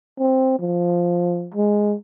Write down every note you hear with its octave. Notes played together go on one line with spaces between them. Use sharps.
C4
F3
G#3